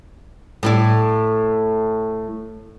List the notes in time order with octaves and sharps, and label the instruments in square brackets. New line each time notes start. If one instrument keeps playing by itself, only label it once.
[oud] A2 E4 D5